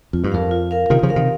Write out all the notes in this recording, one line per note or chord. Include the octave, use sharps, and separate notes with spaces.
F2 F4
G2
F2 A#4 F5
F4
A#4 F5
C3 D#3 F4
C#3 F3
A#4 F5
C3 D#3